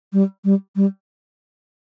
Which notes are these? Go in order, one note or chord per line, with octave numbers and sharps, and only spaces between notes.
G3
G3
G3